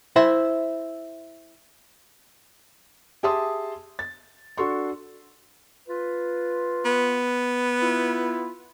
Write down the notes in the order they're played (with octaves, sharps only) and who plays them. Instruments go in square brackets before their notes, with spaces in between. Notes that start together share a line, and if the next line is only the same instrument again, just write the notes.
[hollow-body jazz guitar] E4 C5 E5
[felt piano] G4 G#4 E5 A5 C6 D#6
A6
D4 F#4 A4 C6 C#6
[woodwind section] F4 B4
[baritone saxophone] B3
[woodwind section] E4 F4